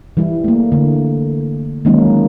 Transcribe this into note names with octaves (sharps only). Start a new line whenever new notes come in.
E3 G3 E4
A3 A#3
D3 A3
D#3 F#3 G#3 A#3 C#4 D#4